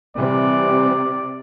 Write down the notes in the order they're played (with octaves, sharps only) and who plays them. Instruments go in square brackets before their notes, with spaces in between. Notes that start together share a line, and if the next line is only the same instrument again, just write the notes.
[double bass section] C3 [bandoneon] E3 G3 [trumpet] D5